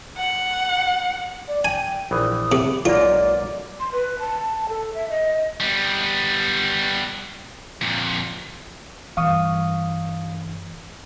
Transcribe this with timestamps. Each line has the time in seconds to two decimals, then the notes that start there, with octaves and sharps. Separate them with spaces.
0.17 F#5
1.48 D5
1.65 G5 G#5
2.11 A#1 E3 D#6
2.52 C3
2.85 B1 G#2 A#3 F4 D5
3.80 C6
3.92 B4
4.20 A5
4.69 A4
4.94 E5
5.10 D#5
5.60 G3 B3
7.82 F2 A#2
9.17 G2 E3 F5 C#6 D#6